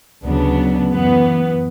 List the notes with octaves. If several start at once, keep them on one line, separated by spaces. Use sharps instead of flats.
D2 C#3 F#3 B3 D4
F#2 E3 B3